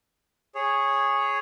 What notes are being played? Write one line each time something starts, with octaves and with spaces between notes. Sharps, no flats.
G#4 C#5